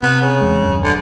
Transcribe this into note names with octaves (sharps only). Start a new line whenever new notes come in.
C3 B3
C#3
E2 G#3
D#1 F#2
D3